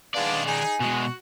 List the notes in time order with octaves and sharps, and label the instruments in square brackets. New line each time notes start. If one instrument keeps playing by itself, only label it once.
[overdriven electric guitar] D#3 D5 [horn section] G#3 B3 D4 [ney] F5
[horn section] D#4 G#4 [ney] G#5
[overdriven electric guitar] B2 G#3 [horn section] F#4